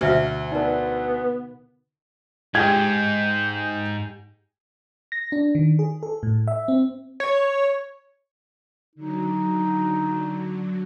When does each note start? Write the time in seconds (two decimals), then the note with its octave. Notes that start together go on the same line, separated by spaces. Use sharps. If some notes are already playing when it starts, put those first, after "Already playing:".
0.01 D2 B2 D3 C5 E5 F5 F6
0.52 B3 D#4 A#4 D5
2.55 G#2 G4 G#4 G6 G#6
5.12 A#6
5.32 D4
5.55 D#3
5.79 G#4
6.03 A4
6.23 A2
6.48 E5
6.68 C4
7.20 C#5
8.95 D3 F#3 D#4